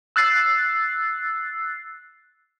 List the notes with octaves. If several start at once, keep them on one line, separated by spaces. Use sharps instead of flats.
E6 F#6 A6 C7